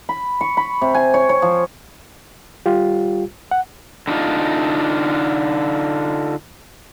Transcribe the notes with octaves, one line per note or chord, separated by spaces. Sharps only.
B5
C#6
B5
C3
G#5
C#5
C#5
F3
G3 F4 G4
F#5
D3 D4 D#4 F4